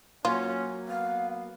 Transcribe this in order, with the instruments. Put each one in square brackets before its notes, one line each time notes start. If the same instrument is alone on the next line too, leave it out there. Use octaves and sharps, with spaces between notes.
[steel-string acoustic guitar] F#3 A#3 [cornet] C#4 [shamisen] F4
[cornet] B3 [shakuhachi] F5